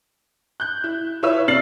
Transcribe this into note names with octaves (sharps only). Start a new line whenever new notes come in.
F#6 G6
E4
E4 F4 B4 C#5 E5 E6
C3 D5 F6 A6 C7 F#7